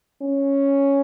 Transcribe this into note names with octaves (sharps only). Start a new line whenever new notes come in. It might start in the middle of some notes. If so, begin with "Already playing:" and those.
C#4